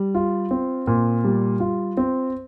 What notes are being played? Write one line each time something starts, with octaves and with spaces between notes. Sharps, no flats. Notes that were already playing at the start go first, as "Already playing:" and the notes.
Already playing: G3
F4
C4
A#2
G3
F4
C4